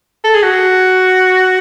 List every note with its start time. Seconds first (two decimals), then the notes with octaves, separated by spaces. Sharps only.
0.24 A4
0.34 G#4
0.43 F#4